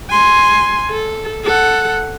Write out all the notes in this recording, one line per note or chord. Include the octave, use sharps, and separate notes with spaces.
G#5 C6
A4
A4 F#5